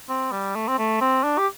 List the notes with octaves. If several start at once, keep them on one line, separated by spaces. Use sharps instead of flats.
C4
G3
A3
C4
A3
C4
D4
G4